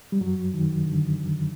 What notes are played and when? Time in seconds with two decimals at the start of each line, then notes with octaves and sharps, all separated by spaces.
0.12 G3
0.21 F#2 F#3
0.54 D#3
0.85 D3